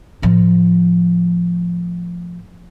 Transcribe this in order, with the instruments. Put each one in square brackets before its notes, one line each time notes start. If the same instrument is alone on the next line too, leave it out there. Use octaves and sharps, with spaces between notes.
[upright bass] A2 F3